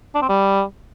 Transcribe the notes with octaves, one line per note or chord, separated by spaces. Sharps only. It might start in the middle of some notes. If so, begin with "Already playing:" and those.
D4
C4
G3